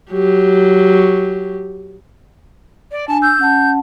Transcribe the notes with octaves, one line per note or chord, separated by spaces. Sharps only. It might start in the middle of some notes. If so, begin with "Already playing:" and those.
F#3 G4
D5
D4 G#5 A5
E6 G6
C#4 F#5 A5